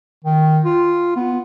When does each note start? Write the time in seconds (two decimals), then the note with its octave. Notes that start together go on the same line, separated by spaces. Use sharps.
0.24 D#3
0.64 F4
1.16 B3